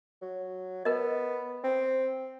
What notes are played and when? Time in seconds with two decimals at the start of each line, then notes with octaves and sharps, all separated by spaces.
0.22 F#3
0.85 B3 A#4 D#5
1.64 C4